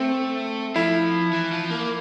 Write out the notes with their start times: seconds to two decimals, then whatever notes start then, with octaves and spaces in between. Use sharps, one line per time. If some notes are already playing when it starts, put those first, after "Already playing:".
Already playing: A3 C4
0.76 F3 E4
1.33 E3
1.52 F3
1.70 A#3